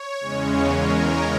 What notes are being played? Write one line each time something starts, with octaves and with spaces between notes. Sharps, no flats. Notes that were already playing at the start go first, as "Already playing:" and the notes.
Already playing: C#5
E2 C#3 G#3 C#4
A#4